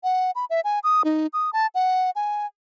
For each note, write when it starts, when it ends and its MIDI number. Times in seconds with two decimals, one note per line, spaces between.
0.04 0.31 78
0.35 0.45 83
0.50 0.61 76
0.64 0.79 80
0.84 1.02 87
1.05 1.27 63
1.33 1.50 87
1.53 1.67 81
1.75 2.10 78
2.16 2.46 80